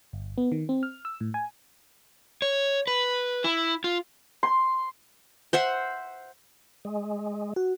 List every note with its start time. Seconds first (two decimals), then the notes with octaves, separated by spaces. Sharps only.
0.13 G1
0.38 B3
0.52 D#3
0.69 C4
0.83 F6
1.05 E6
1.21 A2
1.34 G#5
2.42 C#5
2.87 B4
3.44 E4
3.84 F4
4.43 C6
5.53 C5 E5 F#5
6.85 G#3
7.56 F#4